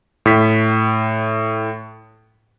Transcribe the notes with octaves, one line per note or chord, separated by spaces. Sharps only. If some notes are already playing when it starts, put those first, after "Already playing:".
A2 B6